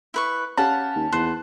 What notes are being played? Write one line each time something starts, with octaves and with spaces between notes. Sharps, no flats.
E4 B4 C#6
C#4 G4 F5 F#5 A5
D#2
E2 C5 F#6